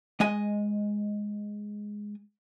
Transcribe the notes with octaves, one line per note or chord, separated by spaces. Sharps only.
G#3 D#5 G#5